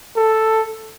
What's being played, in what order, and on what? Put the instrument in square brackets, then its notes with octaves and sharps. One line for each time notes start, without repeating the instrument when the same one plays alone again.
[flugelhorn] A4